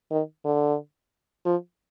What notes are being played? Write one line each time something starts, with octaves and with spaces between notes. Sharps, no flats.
D#3
D3
F3